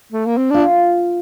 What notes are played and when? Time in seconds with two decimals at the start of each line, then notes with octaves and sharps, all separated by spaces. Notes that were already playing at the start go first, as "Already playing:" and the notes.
0.12 A3
0.26 A#3
0.37 C4
0.51 D4 F4